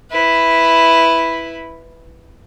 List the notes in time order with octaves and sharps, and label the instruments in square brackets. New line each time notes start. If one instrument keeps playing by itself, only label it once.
[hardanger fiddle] E4 B4